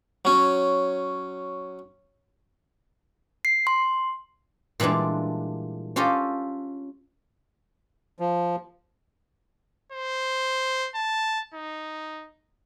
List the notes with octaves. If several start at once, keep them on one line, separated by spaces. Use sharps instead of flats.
F#3 C#4
C7
C6
A#2 E3 G3 G#3 D4
C#4 F4 G4 A4 D#5
F3
C5
A5
D#4